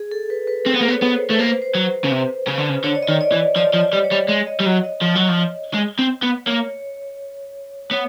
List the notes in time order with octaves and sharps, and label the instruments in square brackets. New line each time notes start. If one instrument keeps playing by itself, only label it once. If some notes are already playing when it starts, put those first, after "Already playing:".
Already playing: [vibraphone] G#4
A4
B4
B4
[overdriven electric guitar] C4 [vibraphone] C5
[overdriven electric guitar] B3
A#3
B3
[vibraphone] C#5
[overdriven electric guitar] B3
[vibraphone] C5
[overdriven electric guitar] A3
[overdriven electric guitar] A#3 [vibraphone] C5
[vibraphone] B4
C5
[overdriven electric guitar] F#3
C#3
C3
C#3
D3
C#3
[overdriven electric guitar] D3 [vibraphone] C#5
[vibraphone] D5
D#5
[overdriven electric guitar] D#3
[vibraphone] D5
[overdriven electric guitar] E3
[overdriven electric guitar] F3 [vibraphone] D5
[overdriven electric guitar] F3
[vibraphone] D5
[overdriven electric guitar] G3
[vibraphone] C#5
[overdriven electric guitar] G3
[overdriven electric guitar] G#3 [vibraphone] C#5
[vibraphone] D#5
[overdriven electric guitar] G3
[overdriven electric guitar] F#3 [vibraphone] D#5
[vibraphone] D#5
[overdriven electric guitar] F3
F#3
F3
G#3
C4
B3
[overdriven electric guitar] A#3 [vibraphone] C#5
[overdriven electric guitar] B3 [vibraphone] C#5